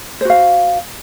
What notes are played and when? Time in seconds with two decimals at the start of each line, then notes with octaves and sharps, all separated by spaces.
0.21 C5
0.25 F#4
0.30 F5